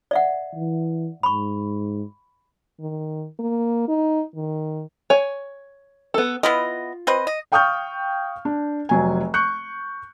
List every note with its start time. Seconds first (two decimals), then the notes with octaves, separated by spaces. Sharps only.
0.11 D5 E5 F#5
0.55 E3
1.23 G#2 B5 C#6
2.81 D#3
3.39 A#3
3.88 D#4
4.35 D#3
5.10 C#5 G#5
6.14 B3 A4
6.43 B3 E4 F4 D#5
7.07 C4 B4 D#5
7.27 D#5
7.52 F5 G5 C#6 D#6 F6 G6
8.45 D4
8.89 F1 F#3 G#5
9.34 C#6 F#6 G6 C#7